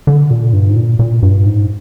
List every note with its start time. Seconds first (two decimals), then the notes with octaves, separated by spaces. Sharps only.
0.07 D3
0.31 A#2
0.53 G2
0.69 G#2
0.76 A#2
0.99 A#2
1.23 G2
1.45 G#2